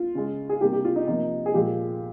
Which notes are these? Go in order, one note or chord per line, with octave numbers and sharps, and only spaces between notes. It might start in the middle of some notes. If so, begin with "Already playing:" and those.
Already playing: F4
C#3 G#3
G#4
C3 G3 A#3 G4
G4
F4
D#4
C3 F3 A#3 D#4
G#4
A#2 F3 G#3 G4